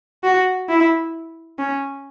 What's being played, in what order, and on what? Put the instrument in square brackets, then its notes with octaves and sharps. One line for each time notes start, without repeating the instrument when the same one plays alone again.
[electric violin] F#4
E4
C#4